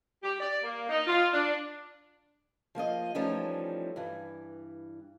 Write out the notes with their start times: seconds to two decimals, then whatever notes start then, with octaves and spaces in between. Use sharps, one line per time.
0.24 G4
0.40 D5
0.63 A#3
0.90 D#4
1.07 F4
1.33 D4
2.75 F3 A#3 F4 D#5
3.14 E3 F3 G3 A3 C#4 D#4
3.96 G2 E3